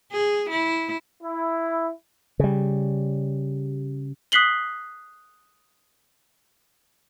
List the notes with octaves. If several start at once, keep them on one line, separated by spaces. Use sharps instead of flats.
G#4
E4
E4
C#3 G3
D#6 F#6 B6 C7 F#7 G7